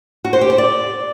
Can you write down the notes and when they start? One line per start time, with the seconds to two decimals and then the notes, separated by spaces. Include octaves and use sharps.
0.24 F#4
0.33 C5
0.41 G4
0.50 C5
0.58 D5